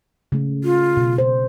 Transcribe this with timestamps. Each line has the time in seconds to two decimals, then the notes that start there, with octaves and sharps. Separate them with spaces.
0.32 C#3 A3
0.64 F4
0.97 B2
1.18 C5